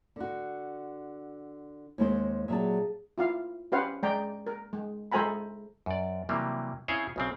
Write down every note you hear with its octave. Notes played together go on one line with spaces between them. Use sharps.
D3 F#4
D#2 G#3 A#3 C4 C5 C#5
A#2 F#3 G#4 E5 A5 A#5
E4 F4 F5
C#4 G4 B4 C5 F5 F#5
G#3 D5 G5 A#5
A#4
G#3
G#3 A4 C5 G#5 A#5 B5
F#2 D5
C3 E3 F#3 G3 A#3
C#3 C4 E4 G#4 C5 C#5
B1 C#3 C4